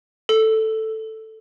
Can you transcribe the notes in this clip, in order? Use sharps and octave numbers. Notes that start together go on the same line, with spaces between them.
A4